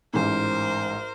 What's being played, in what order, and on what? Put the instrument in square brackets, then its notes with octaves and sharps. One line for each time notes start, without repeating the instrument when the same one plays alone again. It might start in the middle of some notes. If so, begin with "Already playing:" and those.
[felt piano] A1 G#2 [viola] A#4 C5